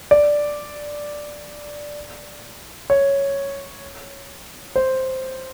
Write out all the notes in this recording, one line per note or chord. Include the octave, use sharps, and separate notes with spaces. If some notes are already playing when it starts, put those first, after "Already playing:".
D5
C#5
C5